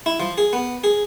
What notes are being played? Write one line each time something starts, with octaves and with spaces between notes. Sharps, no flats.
E4
F3
G#4
B3
G#4